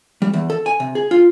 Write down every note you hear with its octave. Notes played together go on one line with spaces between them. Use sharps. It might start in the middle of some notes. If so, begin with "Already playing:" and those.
G3
E2
A4
G#5
C3
G#4
F4